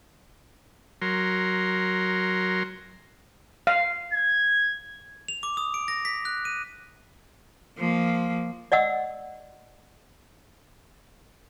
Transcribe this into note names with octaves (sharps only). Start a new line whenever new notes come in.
F#3 A#4 C6
F5
G#6
F7
D6
D#6
D7
A#6
B6
F#6
D#7
F3 A#3
D5 D#5 F#5 E6